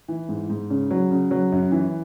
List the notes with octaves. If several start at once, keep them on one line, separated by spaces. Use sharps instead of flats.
E3
G#2
G#2
C#3
F#3
C#3
F#3
F#2
E3